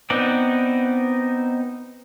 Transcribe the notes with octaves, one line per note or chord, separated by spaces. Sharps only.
B3 C4 D#4 D5